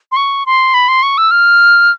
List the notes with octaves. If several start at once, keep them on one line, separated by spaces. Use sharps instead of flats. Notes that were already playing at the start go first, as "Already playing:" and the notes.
C6
C#6
C6
B5
C6
C#6
E6
F6